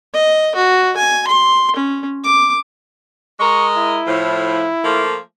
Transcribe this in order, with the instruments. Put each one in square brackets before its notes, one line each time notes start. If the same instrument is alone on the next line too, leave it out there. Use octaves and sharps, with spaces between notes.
[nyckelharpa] D#5
F#4
G#5
C6
C#4
D6
[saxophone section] G#3 A#4 D#5 [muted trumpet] C#6
[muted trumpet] E4
[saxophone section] A2 F3
F3 A3 A#3